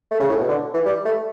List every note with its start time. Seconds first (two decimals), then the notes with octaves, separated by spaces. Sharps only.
0.11 A3
0.20 C#3
0.29 A2
0.39 B2
0.48 D3
0.74 E3
0.86 G3
1.05 A3